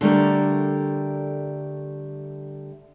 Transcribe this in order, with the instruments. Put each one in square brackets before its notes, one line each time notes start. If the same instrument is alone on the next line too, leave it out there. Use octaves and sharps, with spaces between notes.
[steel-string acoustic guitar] D3 G3 A3 A#4